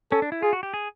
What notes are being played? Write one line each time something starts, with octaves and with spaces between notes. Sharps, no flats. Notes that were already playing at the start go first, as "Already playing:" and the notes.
C#4 A4
D4
E4
F4 G#4
F#4
G4
G#4